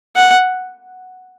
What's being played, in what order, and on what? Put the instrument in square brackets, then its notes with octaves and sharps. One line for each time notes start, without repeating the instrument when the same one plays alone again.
[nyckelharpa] F#5